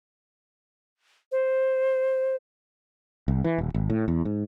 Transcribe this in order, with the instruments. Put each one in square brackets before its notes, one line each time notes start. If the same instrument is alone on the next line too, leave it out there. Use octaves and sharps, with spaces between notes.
[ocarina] C5
[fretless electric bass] C2
E3
D#1
G#1
A2
E2
G#2